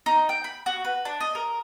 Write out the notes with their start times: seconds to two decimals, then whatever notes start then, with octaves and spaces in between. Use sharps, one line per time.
0.06 D#4
0.29 G5
0.44 B5
0.66 F#4
0.85 B4
1.05 D4
1.20 D#5
1.35 A#4